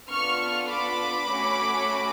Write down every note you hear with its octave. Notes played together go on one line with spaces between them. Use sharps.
B3 D4 F4 A4 C#6 F6
B5 D6
A3 C#4 F#4